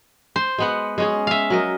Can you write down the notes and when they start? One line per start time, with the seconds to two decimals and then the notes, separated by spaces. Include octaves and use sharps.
0.36 C5
0.58 G#3 B3 F#5
0.98 G#3 C#4 G#4
1.27 E5 F5
1.50 F#3 A#4 D#5